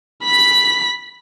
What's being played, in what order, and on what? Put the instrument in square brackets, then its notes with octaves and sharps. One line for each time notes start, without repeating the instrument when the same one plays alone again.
[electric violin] B5 B6